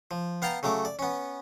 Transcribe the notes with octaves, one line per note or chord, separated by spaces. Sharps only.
F3
B3 F5 G5 A5 A#5
C#3 F#3 A3 D6
D5
B3 C#4